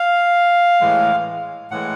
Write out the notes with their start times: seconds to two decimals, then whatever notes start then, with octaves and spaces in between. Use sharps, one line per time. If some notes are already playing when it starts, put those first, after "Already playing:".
Already playing: F5
0.81 A2 E3 G#3
1.71 A2 E3 G#3 F#5